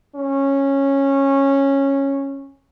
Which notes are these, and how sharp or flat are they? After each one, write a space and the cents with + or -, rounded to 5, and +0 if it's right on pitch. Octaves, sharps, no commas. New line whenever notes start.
C#4 -10